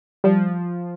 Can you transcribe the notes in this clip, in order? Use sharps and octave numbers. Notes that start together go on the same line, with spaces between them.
F3 G3